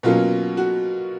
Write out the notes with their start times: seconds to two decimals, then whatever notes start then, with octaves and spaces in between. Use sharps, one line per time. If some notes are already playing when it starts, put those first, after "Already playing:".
0.03 B2 F#3 A#3 C#4 F4
0.57 F#4